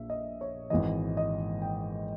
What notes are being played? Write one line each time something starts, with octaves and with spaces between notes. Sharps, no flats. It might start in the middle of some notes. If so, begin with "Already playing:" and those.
Already playing: A#1 A#2 E5
D#5
C#5
G#1 G#2 E3 D#5
D#5
G5